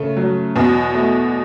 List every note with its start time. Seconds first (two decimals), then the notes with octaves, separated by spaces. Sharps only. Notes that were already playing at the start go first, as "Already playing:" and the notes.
Already playing: C#3 A3
0.17 F#3
0.56 E2 B2
0.94 A3